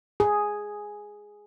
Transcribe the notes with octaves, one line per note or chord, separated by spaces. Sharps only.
G#4